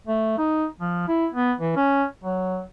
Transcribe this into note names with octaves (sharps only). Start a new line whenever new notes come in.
A3
D#4
F3
E4
B3
E3
C#4
F#3